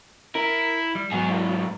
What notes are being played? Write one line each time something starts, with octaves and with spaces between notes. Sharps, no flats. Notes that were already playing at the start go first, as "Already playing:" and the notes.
E4 A#4
G3
G#2 F#3 B3 G#4
G2 E3